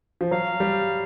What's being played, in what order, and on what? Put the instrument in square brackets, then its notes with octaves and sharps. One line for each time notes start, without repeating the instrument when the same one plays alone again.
[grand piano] F3
[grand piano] F#3 [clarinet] F5
[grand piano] G3